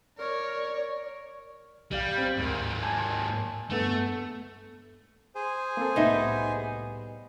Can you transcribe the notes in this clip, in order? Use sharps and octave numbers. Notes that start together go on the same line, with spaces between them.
A#4 C#5 D5
B1 G3 D5 F5
C4
D2 G#2 A#3
G#5 A5 G#6
G2 A3 B3 A4
G#4 C5 G#5
A#3 C4 A4
C2 A2 G3 B3 D#4 D#5 E5